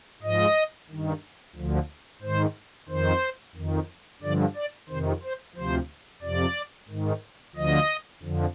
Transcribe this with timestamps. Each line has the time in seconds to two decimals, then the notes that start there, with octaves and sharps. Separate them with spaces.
0.22 G#2 F3 D#5
0.90 G2 D#3
1.55 D2 D3 F3
2.22 G#2 D#3 C5
2.89 F2 D#3 C5
3.55 F2 D#3
4.22 G2 D3 F3 D5
4.56 D5
4.89 F2 C3 D#3 C5
5.23 C5
5.55 D2 C3 F3 C5
6.22 F2 C3 F3 D5
6.88 G#2 D#3
7.55 D2 D3 F3 D#5
8.23 F2 D3 F3